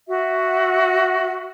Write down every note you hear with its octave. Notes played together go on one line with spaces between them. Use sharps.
F#4 E5